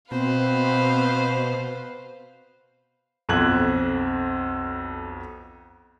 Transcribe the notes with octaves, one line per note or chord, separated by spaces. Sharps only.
B2 C4 B4 C5 F5
B1 F2 C4 F#6 G#6 F#7